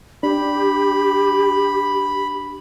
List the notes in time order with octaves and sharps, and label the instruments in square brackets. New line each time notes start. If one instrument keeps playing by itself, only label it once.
[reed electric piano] D4 [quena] G4 [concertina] B5